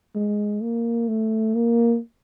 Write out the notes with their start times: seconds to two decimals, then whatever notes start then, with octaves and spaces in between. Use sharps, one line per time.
0.15 G#3
0.63 A#3
1.08 A3
1.55 A#3